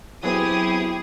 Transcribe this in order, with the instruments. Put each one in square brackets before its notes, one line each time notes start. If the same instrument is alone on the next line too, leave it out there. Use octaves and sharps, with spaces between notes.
[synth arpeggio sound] F#3 B3 C4 [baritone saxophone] E4 [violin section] G4 D#6 [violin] G#4